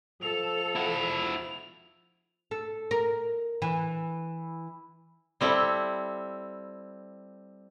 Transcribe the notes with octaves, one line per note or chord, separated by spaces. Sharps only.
F3 A4 F7
E4 F#4
A4
A#4
E3
G3 C4 E4 A4